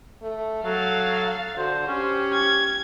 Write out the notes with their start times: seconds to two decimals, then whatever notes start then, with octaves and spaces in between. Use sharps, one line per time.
0.22 A3
0.64 F#3 A4 F5 A6
1.57 D3 F#4 C5
1.88 C#4 G4 C5
2.33 G#6